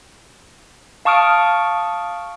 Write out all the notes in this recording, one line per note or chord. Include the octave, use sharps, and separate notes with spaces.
F5 A5 C#6 D#6 F6 D7